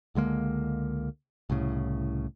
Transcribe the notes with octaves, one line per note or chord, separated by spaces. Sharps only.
C#2 D3 G#3 A#3
C2 A2 C#3